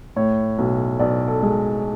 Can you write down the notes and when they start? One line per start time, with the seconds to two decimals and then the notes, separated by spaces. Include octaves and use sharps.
0.16 A2 C#5
0.58 B1
0.99 B1 D5
1.28 A4
1.43 G#3